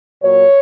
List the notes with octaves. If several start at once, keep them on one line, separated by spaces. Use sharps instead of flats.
A#2 F#3 C#5